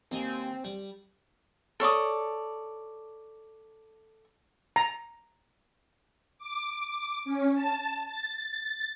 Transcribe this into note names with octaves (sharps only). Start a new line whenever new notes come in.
D#2 C4 D#5 G#5
G3
A4 C#5 D5 D#6
A#5
D6
C#4
A5
A6